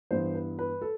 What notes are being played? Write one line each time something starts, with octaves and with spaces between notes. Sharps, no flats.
G2 E3 B3 C5
B4
B4
A4